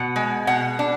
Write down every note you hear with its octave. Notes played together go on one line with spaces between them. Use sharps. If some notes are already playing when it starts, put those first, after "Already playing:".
Already playing: B2 F#5
G#3
B2 F#5
D4